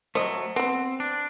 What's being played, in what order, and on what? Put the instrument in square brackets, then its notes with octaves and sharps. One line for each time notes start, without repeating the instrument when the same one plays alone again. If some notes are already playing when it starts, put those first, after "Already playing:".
[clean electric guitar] F#3 G#3 A3 [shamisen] C5 D#5
[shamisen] B3 B5 [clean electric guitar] C4
[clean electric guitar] D4